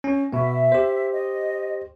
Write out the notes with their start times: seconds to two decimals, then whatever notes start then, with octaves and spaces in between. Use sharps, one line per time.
0.04 C#4
0.33 B2 B3 E5
0.72 G4 C5
1.13 D#5